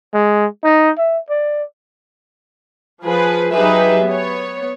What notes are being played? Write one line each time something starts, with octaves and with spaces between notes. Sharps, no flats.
G#3
D#4
E5
D5
F3 G#4 B4
F#3 D#4 G4 G#4 B4 E5
B3 C#5